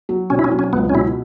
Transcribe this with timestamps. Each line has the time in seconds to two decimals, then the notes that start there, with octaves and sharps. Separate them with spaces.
0.09 F#3
0.30 B2 C#4
0.39 E4
0.44 C#4
0.51 F#3
0.59 C#4
0.73 C#2 B3
0.89 C#4
0.94 B2 E4